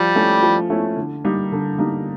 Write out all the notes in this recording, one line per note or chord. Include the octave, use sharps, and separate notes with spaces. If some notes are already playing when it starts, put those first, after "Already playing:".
Already playing: F3 G3
A3 C#4 E4
F3
A3 C#4 E4
D3
G3 A#3 D#4
D3
G3 A#3 D#4